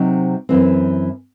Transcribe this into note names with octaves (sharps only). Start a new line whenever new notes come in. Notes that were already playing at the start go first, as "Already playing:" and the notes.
Already playing: C3 F#3 C4 D#4
F#2 E3 C4